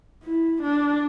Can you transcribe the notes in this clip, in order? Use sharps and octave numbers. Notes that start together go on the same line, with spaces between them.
E4
D4